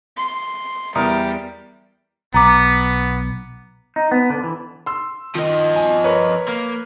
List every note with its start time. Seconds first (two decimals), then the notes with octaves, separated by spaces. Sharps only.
0.17 C6
0.95 E2 G3 A#4 D#6
2.34 B1 B3 A#5 D6
3.96 D#4
4.12 B3
4.30 D3
4.44 E3
4.86 C6 E6
5.35 D#3 F3 D#5
5.76 G#5
6.04 A#4 B4 C#5
6.49 A#3